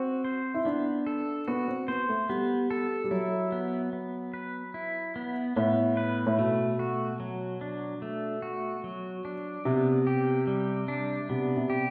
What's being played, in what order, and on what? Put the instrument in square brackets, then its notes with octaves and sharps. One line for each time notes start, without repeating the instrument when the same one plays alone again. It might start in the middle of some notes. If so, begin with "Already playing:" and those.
Already playing: [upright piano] C4 [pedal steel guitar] F#4
[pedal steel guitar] C5
[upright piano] E4
[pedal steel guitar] B3 [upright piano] D4
[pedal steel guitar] A4
[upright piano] B3 [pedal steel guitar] F#4
[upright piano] C4
[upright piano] B3 [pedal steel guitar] C5
[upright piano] A3
[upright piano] G3 [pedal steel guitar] B3
[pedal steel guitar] A4
[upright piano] G3
[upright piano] F#3 [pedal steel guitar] E4
[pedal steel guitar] B3
B3
B4
E4
B3
[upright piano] A2 [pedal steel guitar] B3
[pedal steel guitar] B4
[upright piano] A2
[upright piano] B2 [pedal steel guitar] A3
[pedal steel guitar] F#4
F#3
D4
A3
F#4
F#3
D4
[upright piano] C3 [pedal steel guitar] B3
[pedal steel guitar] G4
G3
D4
[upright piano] C3 [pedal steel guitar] B3
[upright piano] C3
[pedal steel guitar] G4